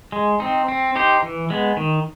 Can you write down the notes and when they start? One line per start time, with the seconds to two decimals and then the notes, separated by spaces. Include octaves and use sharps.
0.12 G#3
0.40 C4 D#4
0.68 C4
0.95 D#4 G4 C5
1.23 E3
1.50 G#3 B3
1.77 D#3